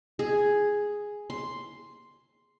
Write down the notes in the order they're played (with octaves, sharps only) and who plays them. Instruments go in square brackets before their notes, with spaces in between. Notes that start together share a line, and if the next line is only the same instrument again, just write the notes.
[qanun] G#4
C6